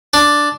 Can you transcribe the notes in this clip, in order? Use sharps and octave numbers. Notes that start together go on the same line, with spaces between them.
D4